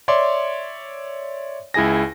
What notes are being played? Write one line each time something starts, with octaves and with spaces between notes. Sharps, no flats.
C#5 D5 E5 C6 D6
C#2 E4 G#4 G#5 A#6